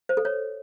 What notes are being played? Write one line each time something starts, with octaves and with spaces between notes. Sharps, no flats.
C5
A4
C#5